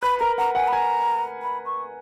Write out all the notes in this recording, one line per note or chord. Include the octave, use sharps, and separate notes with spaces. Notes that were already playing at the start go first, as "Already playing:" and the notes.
B4 B5
A#4 A#5
F#5 A#5
F#5 G#5
B5
G#5 A#5
B5
C#6